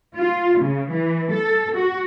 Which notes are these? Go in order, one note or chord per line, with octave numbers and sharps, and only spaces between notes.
F4
C#3
E3
A4
F#4